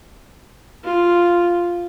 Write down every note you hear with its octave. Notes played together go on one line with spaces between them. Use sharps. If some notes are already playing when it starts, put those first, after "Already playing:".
F4